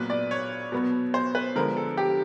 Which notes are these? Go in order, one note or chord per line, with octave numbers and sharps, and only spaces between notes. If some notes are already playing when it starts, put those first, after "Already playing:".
Already playing: A#2 F#3 B3 B4
D5
C#5
B2 F#3 B3
C5
B4
D3 F3 G#3 B3 A#4
A4
G4